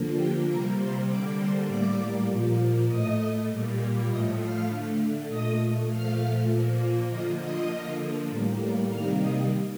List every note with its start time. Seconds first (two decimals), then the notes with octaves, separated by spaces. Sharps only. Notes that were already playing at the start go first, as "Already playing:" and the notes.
Already playing: D3 F3 A#3
0.16 G4 G5
0.46 C3 G3 A#3 A#4 A#5
0.77 C5 C6
1.07 D3 G3 A#3 D5 D6
1.37 C5 C6
1.66 A2 G3 A#3 D5 D6
2.27 A#2 F3 A#3
2.87 A2 A3 D#5 D#6
3.48 A#2 G3 A#3
4.07 A2 F3 A3 D#5 D#6
4.38 F5 F6
4.68 D3 A3
5.28 A#2 A3 D#5 D#6
5.88 A#2 F3 A3 F5 F6
6.48 A#2 F3 A#3
7.09 D3 F3 A#3 D#5 D#6
7.39 D#5 D#6
7.69 D3 F3 A#3
8.30 A2 G3 A#3
8.89 C3 D#3 G3 A#3 F5 F6
9.20 D#5 D#6